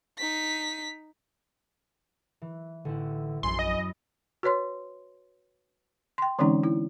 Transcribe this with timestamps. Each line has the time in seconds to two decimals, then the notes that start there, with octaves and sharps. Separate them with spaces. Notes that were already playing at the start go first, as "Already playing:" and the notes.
0.18 D#4 B6
2.42 E3
2.85 A1 D3 E4
3.43 A#1 F#2 G#5 B5 C6
3.59 D#5
4.43 F#4 B4 C#5 C6
6.18 G5 C6
6.39 D3 E3 G#3 C4 C#4 D#4
6.63 E4